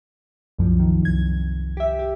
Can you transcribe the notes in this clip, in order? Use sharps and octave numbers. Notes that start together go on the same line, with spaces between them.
C2 F#2 F3
D#3
C2 G#6
G4 E5
G4